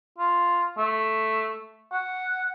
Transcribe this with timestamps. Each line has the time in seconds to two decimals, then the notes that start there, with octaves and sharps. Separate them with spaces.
0.18 F4
0.78 A3
1.92 F#5